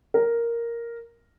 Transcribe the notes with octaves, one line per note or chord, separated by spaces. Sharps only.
A#4